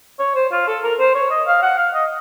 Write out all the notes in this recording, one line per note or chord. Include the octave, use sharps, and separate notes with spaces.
C#5
C5
F4
A4
A#4
C5
C#5
D#5
F5
F#5
F5
D#5